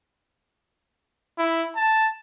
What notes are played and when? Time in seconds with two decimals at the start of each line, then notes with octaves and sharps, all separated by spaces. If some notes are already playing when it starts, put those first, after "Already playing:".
1.39 E4
1.76 A5